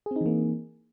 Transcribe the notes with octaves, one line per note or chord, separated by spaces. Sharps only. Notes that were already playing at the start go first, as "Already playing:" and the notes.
E3 A#3 C4 D#4 G#4